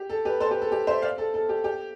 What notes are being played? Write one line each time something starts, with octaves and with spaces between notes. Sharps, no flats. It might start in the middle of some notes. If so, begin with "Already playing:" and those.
Already playing: G4
A4
G4 B4
A4 C5
G4 B4
A4
G4
C5 E5
D5 F5
A4
A4
G4
G4